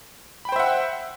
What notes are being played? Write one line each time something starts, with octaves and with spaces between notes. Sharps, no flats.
C5 E5 F#5 G5 B5